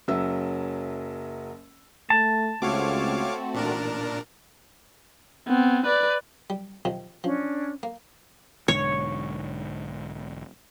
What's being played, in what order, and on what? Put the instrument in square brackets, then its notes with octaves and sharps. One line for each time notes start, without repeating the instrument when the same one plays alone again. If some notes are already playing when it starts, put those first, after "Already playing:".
[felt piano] F#1 F#3 C#4 E5 E6
[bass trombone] A3 [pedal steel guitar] A5
[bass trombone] C#2 [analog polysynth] A3 C4 F#4 [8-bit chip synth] C#5 F5 D6
[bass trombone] A1 [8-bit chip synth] A#2 D4 A#4
[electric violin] B3 C4
B4 D5
[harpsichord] G3
C3 D#3 F3
[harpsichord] F3 [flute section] C#4 D4
[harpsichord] A#3
[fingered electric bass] B1 G#2 D3 [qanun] C#5